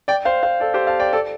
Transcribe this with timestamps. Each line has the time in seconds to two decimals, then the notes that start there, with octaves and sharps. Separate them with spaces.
0.08 D5 G5
0.25 C5 F5
0.43 C5 F5
0.60 A4 D5
0.74 G4 C5
0.87 F5 A5
1.00 D5 G5
1.13 A4 D5